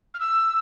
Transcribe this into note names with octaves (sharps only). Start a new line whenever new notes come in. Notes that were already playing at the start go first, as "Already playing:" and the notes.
F6
E6